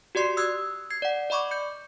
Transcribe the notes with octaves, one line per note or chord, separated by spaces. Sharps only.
F#4 G4 D5 C6 C7
D#6 E6 F#6 G#6
G#6 C7
D5 F#5
D5 D#5 B5 C#6 D6
G6 C#7